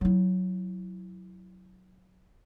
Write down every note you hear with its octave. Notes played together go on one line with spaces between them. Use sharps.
F#3 E4